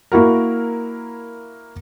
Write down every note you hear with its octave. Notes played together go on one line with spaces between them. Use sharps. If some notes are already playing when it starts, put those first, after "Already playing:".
A#3 E4 F#4 A#4